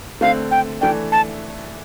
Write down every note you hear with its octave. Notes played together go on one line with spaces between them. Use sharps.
D3 A3 C4 F5
G5
E3 A3 D4 G5
A5